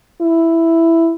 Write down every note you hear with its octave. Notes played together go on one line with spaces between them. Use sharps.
E4